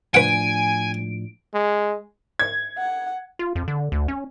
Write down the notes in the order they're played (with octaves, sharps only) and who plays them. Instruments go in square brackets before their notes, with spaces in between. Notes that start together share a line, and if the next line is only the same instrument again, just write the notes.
[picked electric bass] A2 F3 D4 [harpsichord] B4 F#5 [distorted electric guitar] G#5 [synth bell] D7
[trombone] G#3
[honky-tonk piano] G#6
[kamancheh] F#5
[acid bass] F4
F2
D3
D2
C#4